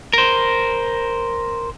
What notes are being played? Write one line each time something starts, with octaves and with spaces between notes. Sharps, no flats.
A#4 C5